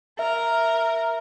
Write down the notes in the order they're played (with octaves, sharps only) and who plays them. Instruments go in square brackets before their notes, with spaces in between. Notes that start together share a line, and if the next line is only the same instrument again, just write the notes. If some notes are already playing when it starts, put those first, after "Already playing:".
[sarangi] A#4 [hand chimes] E5